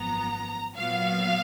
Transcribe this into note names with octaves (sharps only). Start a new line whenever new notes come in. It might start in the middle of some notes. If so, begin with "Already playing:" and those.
Already playing: G#1 F#2 F3 B3 A#5
A#2 F#3 B3 F5